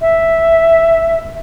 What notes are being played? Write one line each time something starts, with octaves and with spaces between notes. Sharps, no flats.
E5